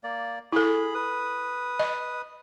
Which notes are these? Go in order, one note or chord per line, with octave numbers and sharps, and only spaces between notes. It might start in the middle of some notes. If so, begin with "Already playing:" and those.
A#3 D5
E4 G#4 A4 B5
B4 D#6
D#5